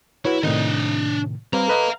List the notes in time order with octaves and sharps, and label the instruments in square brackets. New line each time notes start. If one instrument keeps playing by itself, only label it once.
[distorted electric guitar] E4 [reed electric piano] F#4 B4 C#5
[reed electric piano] A2 C3 D#3 [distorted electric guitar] D4 D#5
[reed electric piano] G3 C4 B4 [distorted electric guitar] F5 A#5
[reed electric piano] A4 B4 D#5